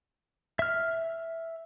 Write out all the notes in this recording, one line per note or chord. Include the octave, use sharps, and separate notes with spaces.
E5 F6